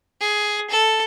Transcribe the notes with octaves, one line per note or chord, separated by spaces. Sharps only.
G#4
A4